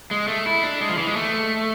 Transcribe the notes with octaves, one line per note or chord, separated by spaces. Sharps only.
G#3
A3
E4
D4
G#3
F3
E3
G#3
A3